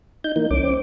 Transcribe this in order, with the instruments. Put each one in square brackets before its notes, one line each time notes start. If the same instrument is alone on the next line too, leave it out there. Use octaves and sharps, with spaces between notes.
[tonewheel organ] D#4 G6
E3 A#3 D#4
[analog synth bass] C2 [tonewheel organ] C#4 D6
[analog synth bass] C4